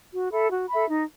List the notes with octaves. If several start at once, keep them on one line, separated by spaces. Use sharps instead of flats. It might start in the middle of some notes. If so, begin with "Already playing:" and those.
F#4
A4 E5 B5
F#4
A4 E5 B5
D#4